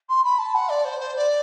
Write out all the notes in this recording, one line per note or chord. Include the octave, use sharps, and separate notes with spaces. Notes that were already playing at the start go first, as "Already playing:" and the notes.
C6
B5
A5
F#5
D5
C5
C5
D5